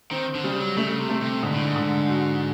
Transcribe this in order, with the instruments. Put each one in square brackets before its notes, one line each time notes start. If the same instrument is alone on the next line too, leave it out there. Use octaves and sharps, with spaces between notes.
[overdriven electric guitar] D#3 [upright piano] C4
[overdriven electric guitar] D3
[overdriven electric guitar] C#3 [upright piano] G3
[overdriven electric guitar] F#3
[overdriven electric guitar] C#3 [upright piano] A3
[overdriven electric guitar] C3
[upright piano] A3
[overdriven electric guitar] C3
[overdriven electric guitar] G#2 [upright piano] D3
[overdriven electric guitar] A2
G#2
[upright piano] D3
F#4